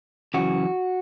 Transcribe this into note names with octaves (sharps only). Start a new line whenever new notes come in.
F#2 C#3 E3 F#4